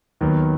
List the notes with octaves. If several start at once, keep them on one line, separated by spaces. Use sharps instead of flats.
D#2 D#3 F#3 B3